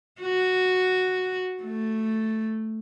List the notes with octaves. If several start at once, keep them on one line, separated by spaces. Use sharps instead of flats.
F#4
A3